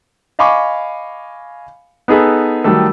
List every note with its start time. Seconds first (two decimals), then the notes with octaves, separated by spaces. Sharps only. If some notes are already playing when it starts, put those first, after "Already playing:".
0.39 D#5 F5 G#5 B5 C#6 D6
2.08 B3 D#4 G#4 A4 B4
2.64 D#3 F#3 G3 A3 A4